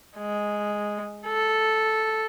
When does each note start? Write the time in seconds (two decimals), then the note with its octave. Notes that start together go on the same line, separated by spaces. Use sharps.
0.17 G#3
1.27 A4